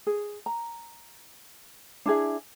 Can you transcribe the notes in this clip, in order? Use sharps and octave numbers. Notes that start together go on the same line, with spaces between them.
G#4
A#5
D4 E4 G#4 E5